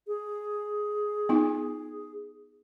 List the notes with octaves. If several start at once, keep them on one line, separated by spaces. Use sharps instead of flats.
G#4
B3 D#4 F4